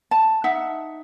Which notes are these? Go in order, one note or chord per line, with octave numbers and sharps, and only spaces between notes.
A5
D#4 E5 F#5